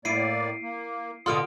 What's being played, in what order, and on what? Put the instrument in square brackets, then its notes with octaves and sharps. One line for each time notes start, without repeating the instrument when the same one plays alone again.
[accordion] A2 A#3 D5 [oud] E4 [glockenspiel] C7 D7 D#7
[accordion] A#3
[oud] B2 D3 F4 [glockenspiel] C6 F6 D7 [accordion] D#6